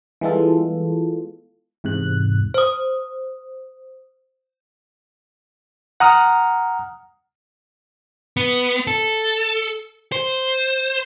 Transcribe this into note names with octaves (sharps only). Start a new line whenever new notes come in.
E3 G3 G#3 B3 F4 A4
E2 G#2 C3 F#6
C5 D#6
F#5 A#5 D#6 F6
B3
A4
C5